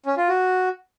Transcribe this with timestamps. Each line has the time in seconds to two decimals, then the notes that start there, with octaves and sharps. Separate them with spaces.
0.06 C#4
0.17 F4
0.29 F#4